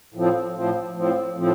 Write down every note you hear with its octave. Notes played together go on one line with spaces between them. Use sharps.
A2 F3 C4
A2 F3 C4
A2 F3 C4
A2 F3 C4